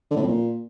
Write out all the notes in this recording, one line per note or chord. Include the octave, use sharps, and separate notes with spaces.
D3
A2
F2
A#2